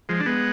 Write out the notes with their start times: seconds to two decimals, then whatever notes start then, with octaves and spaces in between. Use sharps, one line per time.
0.09 F3 G#3
0.20 D4
0.26 G#3 B3